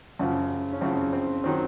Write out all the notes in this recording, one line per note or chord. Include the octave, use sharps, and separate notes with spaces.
F#2 C#3 F3
C#4
F#2 C#3 F3 C4
C4
D#3 F#3 C4